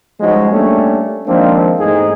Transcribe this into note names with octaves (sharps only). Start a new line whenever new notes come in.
F3 G3 G#3 C#4 D#4 F#4
G3 A3 A#3 C#4 D4 G4
D#3 F3 G#3 A#3 C4 D4
E2 G#2 A3 C4 D#4 G#4